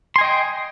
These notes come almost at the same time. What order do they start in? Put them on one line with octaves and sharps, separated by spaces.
C6 G#5 D#5 G5